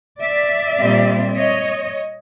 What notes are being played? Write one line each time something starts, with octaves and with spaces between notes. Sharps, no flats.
D5 E5
A#2 G3 C4
C#5 D#5